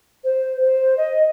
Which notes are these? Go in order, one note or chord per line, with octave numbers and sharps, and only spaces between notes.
C5
C5
D#5